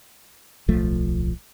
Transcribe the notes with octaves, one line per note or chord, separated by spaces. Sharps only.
D1 B1 F3 A3